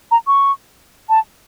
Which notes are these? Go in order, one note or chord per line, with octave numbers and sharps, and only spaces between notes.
A#5
C#6
A5